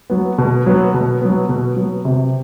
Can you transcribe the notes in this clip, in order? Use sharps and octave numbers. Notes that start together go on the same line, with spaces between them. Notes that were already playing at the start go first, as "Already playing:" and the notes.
F#3 B3
B2
F#3 B3
B2
F#3 B3
B2
F#3 B3
C3